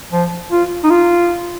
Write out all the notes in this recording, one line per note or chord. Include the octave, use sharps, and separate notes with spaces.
F3
F4
D#4
F4